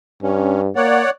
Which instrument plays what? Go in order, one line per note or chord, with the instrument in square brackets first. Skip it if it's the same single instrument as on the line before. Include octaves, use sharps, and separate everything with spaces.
[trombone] G2 [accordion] C#4
[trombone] A#3 [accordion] C#5 D5 F#5